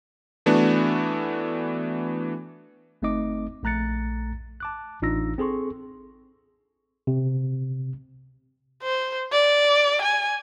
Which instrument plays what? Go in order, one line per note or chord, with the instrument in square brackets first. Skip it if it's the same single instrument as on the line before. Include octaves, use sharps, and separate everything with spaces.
[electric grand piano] E3 A3 B3 D4 F#4
[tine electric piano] G1 A3 C4 D#4 D#5 D6
A#1 A3 A#5 F#6 A6 C#7
A5 D6 F#6
A1 D4 D#4 F4 E6 A#6
C4 G#4 A4 C6 C#6
C3
[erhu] C5
D5
G#5